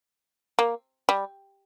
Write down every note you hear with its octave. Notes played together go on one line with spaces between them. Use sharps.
A#3
G3